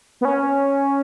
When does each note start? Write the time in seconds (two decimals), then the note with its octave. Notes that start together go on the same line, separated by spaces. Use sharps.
0.21 B3
0.25 C#4